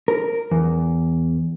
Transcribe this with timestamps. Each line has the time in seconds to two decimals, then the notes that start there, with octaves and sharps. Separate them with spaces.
0.08 A#4
0.51 E2